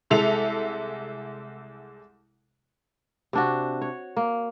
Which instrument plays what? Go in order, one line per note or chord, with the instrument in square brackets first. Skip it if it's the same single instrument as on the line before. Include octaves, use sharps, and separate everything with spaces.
[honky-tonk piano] C2 G#3 A4 E5 F7
[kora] C3 D4 F#4
C#5
A#3